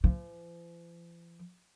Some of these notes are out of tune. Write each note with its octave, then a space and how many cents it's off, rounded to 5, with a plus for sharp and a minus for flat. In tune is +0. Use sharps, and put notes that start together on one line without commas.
F3 -45